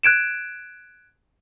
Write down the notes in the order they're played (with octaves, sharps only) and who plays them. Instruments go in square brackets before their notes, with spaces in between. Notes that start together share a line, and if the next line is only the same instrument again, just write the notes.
[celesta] F#6 G#6 D7 E7